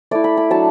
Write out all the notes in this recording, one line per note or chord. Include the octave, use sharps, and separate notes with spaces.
A3 E4 D5
B5
B5
F#3 D4 A5